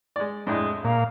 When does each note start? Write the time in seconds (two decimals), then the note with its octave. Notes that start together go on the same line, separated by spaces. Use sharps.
0.16 G#3 D5
0.47 F2 A2 G#3 D4
0.84 A#2 F5